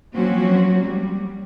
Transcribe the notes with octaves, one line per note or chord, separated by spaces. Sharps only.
F3 F#3 A#3 C4 C#4 F#4
G3